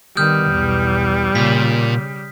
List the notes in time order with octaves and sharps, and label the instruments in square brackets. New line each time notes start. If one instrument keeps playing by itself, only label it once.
[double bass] D#3 B3 [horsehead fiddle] G3 [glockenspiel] D#6 F6 G6
[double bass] B1 E2
[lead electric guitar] A#2 [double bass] C#3 [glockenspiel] B6